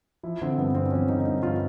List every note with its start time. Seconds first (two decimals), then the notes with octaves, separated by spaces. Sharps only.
0.23 F3 E4
0.42 D3 C4
0.58 G2 B3
0.75 G2 C4
0.85 D4
0.91 F3 C#4
1.09 D3 D#4
1.25 G2 D#4
1.42 G2 F4